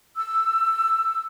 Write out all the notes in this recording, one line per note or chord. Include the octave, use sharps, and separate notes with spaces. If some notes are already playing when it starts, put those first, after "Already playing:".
E6